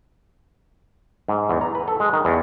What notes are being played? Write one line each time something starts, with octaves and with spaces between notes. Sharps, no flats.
G#2
E2
A#5
B4
A4
G#3
D#3
E2